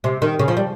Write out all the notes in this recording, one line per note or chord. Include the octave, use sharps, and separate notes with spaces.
C3
D#3
C#3
F3
G3